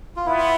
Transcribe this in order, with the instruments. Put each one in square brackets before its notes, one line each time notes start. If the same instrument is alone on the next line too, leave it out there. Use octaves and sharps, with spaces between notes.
[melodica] F4
[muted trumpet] B3 [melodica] E4